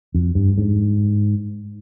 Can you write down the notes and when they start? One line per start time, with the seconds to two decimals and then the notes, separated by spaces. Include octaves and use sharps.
0.14 F2
0.35 G2
0.58 G#2